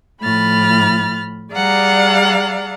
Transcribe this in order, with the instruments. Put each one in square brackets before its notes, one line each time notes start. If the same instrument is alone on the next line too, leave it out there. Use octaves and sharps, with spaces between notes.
[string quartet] A2 F3 B5 F6 A6
G3 G#4 D5 F5 F#5 A#5